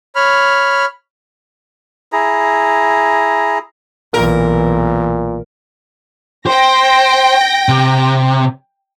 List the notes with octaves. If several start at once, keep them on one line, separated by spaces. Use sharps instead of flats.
C#5 B5 F6
E4 G#4 A#5
B1 A#2 E3 A#4
C5 G5 A#6
C3